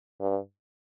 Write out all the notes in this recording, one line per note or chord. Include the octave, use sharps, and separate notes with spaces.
G2